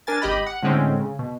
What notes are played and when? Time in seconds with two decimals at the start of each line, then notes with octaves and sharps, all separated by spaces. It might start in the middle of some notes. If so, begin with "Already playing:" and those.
0.07 D4 A#4 G#5 A6
0.22 G#1 G4 D#5 B5
0.46 F#5
0.62 A2 D3 G#3 C4 C#4
1.00 C#3
1.19 B2